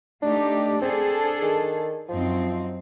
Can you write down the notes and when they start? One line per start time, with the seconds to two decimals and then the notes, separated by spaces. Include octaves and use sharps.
0.22 A3 D4 D#4 G4
0.82 C4 D4 G#4 A4
1.42 D#3
2.09 F#2 F3 C4 D#4